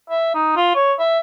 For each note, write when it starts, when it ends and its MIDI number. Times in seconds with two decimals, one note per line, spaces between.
0.10 0.30 76
0.35 0.52 63
0.57 0.73 65
0.75 0.93 73
0.99 1.19 76